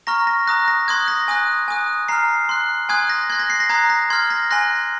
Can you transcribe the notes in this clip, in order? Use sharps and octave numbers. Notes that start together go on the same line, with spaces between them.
A#5 C#6 F6 A#6
A#6
A#5 D#6 F#6 A#6
A#6
C6 D#6 F#6 G#6
A#6
G#5 D#6 F#6
G#5 D#6 F#6
A#5 F6 C7
C6 F#6
G#5 C6 D#6 F#6 G#6
A#6
C6 F#6 G#6
A#6
C7
A#6
A#5 D#6 F#6 G#6
A#6
C6 F6 G#6
A#6
G#5 C6 F#6 A#6